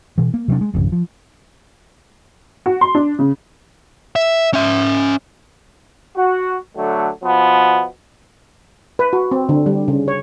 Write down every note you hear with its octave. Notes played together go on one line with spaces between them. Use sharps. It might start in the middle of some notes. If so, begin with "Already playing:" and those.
B2 E3
A#3
C3 F#3 A3 D4
G#3
D1 G#1 F2 C#3
F3
F#4
C6
D4
C#3
E5
C#4 E5
F#4
D3 F#3 A3
B2 F3 B3
B4
F#4
C4
D3
G3
C#3
C#5